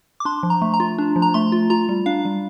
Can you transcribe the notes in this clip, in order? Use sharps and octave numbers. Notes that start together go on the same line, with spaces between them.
D6
D4 C6
F3
A#5
A3
A#5
F4
D4
F3
A#5
A3 C6
F4
F4 A#5
G3
D4 F5
G3